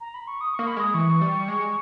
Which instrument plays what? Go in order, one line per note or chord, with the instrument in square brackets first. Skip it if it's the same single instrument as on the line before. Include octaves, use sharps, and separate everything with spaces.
[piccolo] A#5
B5
C#6
D#6
[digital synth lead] A#3 [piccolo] C#6
[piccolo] B5
[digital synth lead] G#3 [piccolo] D#6
[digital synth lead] E3 [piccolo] C#6
[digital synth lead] G3
G#3